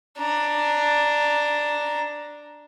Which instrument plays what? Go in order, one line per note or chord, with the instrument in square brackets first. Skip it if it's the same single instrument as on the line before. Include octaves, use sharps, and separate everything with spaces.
[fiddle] D4 A#5